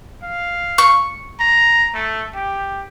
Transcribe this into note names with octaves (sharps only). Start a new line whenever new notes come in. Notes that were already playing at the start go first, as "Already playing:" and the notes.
F5
C#6
A#5
A3
G4